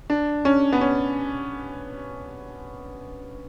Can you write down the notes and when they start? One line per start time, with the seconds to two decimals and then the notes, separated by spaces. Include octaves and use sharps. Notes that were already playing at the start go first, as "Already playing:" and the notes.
0.10 D4
0.45 C#4
0.72 B3
0.81 C#4